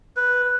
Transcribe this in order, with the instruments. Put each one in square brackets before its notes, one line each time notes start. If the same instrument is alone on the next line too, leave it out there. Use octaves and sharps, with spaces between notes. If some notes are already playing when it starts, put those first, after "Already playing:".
[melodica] B4